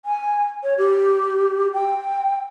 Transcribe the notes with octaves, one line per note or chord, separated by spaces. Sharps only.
G#5
C#5
G4
G5